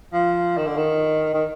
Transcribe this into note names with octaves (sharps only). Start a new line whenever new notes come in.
F3
D#3
D3
D#3
D#3